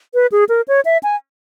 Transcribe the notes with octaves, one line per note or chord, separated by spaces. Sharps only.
B4
G#4
A#4
C#5
E5
G#5